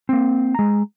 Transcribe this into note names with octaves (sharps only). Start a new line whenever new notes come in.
A#3 C4
G#3 A#5